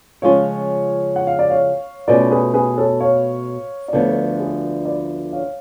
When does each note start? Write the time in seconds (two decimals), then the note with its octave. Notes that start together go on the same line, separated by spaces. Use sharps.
0.22 C#3 F3 G#3 C#4 F4 C#5 F5
1.16 F#5
1.27 F5
1.39 D5
1.50 C#5 F5
2.08 B2 A3 C#4 F4 B4 D5
2.31 G#4 B4
2.54 G#4 B4
2.78 A4 C#5
3.00 C#5 F5
3.88 D5
3.93 D2 D3 F3 B3 A4 C#5
4.39 G#4 B4
4.85 B4 D5
5.32 C#5 F5